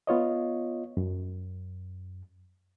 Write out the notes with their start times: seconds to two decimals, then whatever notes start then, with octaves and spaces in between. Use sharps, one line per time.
0.07 B3 F4 C#5 D#5
0.97 F#2